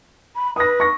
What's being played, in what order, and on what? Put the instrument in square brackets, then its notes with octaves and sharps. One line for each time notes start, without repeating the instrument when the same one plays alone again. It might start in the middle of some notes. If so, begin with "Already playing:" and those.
[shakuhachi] B5
[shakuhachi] B4 [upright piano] D#6 A#6
[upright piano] C#6 A#6